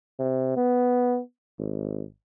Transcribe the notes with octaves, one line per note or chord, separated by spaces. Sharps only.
C3
B3
G#1